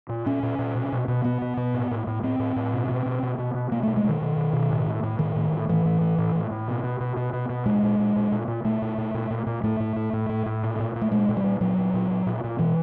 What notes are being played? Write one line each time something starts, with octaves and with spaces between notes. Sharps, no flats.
A#2
A#2 C#4
A#2
A#2
B2
B2
B2
B2 B3
B2
B2
A2
A2
A2
A2 C4
A2
A2
B2
B2
B2
B2
B2
B2
B2 A#3
A3
B2
G#3
B2 D#3
B2
B2
B2
A2
A2
A2
A2 D#3
A2
A2
A2 E3
A2
A2
A2
A2
A2
B2
B2
B2
B2
B2
B2
A#2 G#3
A#2
A#2
A#2
A#2
A#2
A#2 A3
A#2
A#2
A#2
A#2
A#2
A2 A3
A2
A2
A2
A2
A2
A#2
A#2
A#2
A3
A#2 G#3
A#2
G3
A#2
A#2 F#3
A#2
A#2
A#2
A#2
A#2
B2 E3